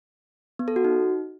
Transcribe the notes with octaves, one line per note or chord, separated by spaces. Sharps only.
B3
A4
F#4
D#4